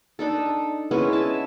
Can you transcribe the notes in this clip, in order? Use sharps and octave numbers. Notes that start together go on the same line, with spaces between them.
D4 D#4 A4
G#3 B3 C#4 E4
E5 A5